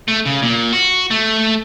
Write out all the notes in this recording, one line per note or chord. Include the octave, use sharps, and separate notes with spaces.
A3
C#3
A#2
F#4
A3